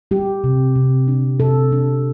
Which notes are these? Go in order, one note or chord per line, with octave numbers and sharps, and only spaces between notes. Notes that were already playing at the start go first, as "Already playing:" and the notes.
G3 G4
C3
C3
D4
C3 A4
D4